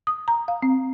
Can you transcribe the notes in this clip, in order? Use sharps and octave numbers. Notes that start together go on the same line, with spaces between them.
D#6
A#5
F5
C4